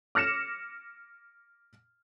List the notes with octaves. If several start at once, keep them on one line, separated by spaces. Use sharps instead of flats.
D6 F6 A#6 C#7 E7